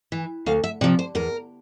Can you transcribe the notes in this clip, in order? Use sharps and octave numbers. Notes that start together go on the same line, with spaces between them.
E3
D2 F5
E5
C3 F3 D5
C5
E2 A#4